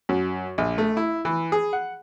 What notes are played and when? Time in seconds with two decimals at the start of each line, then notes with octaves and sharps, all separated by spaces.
0.09 F#2
0.58 A#1
0.78 A3
0.97 E4
1.25 E3
1.52 G#4
1.73 F#5